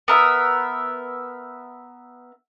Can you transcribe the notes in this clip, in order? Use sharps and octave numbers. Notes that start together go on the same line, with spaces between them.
B3 A#4 E5